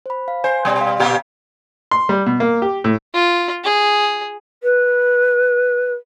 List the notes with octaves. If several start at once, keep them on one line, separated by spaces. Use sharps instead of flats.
C5 B5
F5
C5 G#5
B2 G3
F5
A#2 G4
C6
G3
B2
A#3
G4
A2
F4
G#4
B4